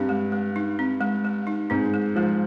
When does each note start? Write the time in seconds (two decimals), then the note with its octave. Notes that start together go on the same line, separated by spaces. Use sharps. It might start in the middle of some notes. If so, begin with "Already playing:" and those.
Already playing: G2 C4
0.09 G#3
0.32 G#3
0.56 D#4
0.79 C4
1.01 G#3
1.25 G#3
1.47 D#4
1.70 G#2 C4
1.94 G#3
2.16 F3 G#3